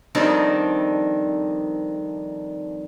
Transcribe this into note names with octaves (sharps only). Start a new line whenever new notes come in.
F2 D#3 G3 C4 D4 D#4